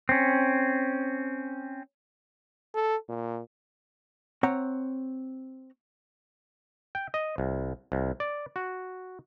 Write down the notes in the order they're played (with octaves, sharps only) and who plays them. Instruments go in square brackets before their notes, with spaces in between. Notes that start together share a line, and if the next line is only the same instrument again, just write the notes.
[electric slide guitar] C4 C#4
[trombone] A4
A#2
[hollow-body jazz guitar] C4 C#5 F#5 A#5
[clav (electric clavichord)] G5
D#5
C2
C2
D5
F#4